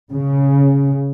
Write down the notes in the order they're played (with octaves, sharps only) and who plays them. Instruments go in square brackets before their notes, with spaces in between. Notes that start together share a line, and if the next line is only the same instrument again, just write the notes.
[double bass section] C#3